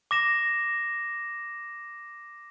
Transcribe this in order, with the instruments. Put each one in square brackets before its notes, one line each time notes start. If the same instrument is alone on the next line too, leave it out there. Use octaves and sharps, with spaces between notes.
[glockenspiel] D6 A#6 E7